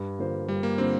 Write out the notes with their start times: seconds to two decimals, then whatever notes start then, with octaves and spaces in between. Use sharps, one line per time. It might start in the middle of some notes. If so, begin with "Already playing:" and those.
Already playing: G2
0.19 D3 A#3 F4 C5
0.48 G2 G3
0.63 A#3
0.78 D3 A#3 C4 F4 C5